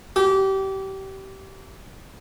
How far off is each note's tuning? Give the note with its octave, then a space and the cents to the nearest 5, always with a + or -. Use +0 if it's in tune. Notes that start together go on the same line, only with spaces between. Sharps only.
G4 -25